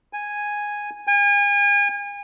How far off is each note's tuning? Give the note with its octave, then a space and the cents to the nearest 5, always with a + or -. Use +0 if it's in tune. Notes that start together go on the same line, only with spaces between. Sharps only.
G#5 -5
G#5 -35